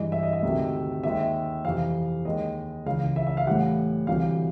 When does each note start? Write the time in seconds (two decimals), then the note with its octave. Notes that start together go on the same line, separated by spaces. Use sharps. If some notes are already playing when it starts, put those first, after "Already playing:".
Already playing: G2 E3 G#3 D#5
0.12 E5
0.23 D#5
0.33 E5
0.43 D2 C3 D#3 G#3
1.03 D#2 D#3 G#3 E5
1.65 F2 C3 E3 F5
2.25 D#2 D#3 G#3 D#5
2.86 C#2 C#3 E3 F5
3.16 E5
3.27 E5
3.37 F5
3.47 A2 E3 G3 F#5
4.07 D2 C3 E3 G3 F5